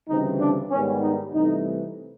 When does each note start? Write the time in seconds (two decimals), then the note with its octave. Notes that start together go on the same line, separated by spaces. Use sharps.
0.09 D2 C#3 E3 G3 C4 D#4
0.40 D4
0.71 G#2 D#3 G3 B3 C#4
1.02 D#4
1.34 C2 C3 E3 A3 D#4